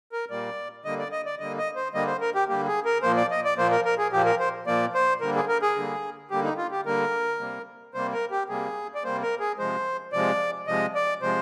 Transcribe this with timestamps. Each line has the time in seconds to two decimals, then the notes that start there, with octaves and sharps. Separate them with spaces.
0.12 A#4
0.30 A#2 G3 A#3 D5
0.85 D3 G3 A#3 D#5
0.98 D5
1.12 D#5
1.26 D5
1.39 D3 G3 A#3 D#5
1.58 D#5
1.76 C5
1.94 D3 G3 A#3 D#5
2.07 C5
2.21 A#4
2.35 G4
2.48 D3 G3 A#3 G4
2.67 G#4
2.85 A#4
3.02 A#2 F3 A#3 C5
3.17 D5
3.31 D#5
3.44 D5
3.57 A#2 F3 A#3 C5
3.71 A#4
3.85 A#4
3.98 G#4
4.12 A#2 F3 A#3 G4
4.26 A#4
4.39 C5
4.67 A#2 F3 A#3 D5
4.94 C5
5.21 D3 G3 A#3 A#4
5.36 G#4
5.48 A#4
5.62 G#4
5.76 D3 G3 A#3
6.31 D3 G3 A#3 G4
6.44 D#4
6.58 F4
6.71 G4
6.86 D3 G3 A#3 A#4
7.40 C3 G3 A#3
7.94 C3 G3 A#3 C5
8.13 A#4
8.31 G4
8.49 C3 G3 A#3 G#4
8.95 D5
9.04 C3 G3 A#3 C5
9.22 A#4
9.40 G#4
9.58 C3 F3 G#3 C5
10.12 C3 F3 G#3 D5
10.67 C3 F3 G#3 D#5
10.95 D5
11.22 C3 F3 G#3 C5